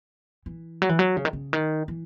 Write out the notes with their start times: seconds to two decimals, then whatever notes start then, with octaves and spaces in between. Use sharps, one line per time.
0.46 E3
0.82 F#3
0.89 E3
0.99 F#3
1.17 C#3
1.25 D#3
1.33 C#3
1.53 D#3
1.88 E3